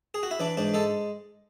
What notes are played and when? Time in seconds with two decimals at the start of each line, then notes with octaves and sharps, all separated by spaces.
0.14 G#4
0.23 F#4
0.31 E4
0.40 E3 D4
0.57 G#2 D4
0.74 G#3 A4